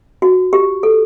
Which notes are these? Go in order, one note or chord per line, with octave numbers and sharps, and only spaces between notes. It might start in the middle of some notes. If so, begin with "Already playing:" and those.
F#4
G4
A4